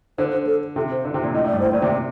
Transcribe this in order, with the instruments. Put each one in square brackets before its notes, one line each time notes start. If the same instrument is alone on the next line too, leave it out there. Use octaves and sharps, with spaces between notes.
[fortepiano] D3 [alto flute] C5
[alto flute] C5
A4
[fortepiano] C3 [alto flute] A4
[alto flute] C5
[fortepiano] D3
C3
A#2
[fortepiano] A2 [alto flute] D#5
[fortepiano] A2
[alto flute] D5
[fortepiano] G2
[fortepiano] A2 [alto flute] C5
[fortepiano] A#2 [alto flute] D5
[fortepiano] C3